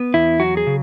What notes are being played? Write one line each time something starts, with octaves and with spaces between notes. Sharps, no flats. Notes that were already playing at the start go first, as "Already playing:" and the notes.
Already playing: B3
E2 E4
F#3 F#4
G#4
C#3